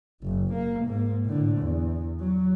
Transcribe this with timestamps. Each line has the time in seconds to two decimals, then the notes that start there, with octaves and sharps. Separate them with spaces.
0.22 F#1
0.53 A#3
0.86 G#2 A#3
1.25 A2 D3
1.57 E2
2.20 F#3